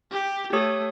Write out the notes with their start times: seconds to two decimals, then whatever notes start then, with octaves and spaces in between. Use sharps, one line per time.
0.12 G4
0.53 A3 G4 C#5 D#6